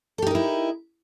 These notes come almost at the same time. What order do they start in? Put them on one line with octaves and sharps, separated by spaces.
A4 G4 D#4 A#4 E4